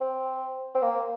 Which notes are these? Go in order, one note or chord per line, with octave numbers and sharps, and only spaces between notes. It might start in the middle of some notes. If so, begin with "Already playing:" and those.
C4
C4
A#3